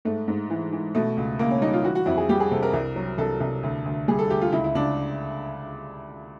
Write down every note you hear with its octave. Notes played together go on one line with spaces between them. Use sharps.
G#2 A3
G#2
E3
E3
B2 A3
C#2
C#2 A#3
C#4
G3 D#4
F4
E3 F#4
F#4
F2 E4
G#4
G3 G4
G#4
C3 A4
A#4
C2
F#3
C2 A4
C2
D2
D2
G3 G#4
A4
D2 G4
F4
C#2 E4
E4
C#2 D4